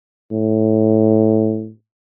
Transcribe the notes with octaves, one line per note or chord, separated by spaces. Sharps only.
A2